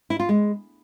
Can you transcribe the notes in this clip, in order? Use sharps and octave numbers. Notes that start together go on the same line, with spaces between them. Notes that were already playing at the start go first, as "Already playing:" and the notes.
E4
F4
G#3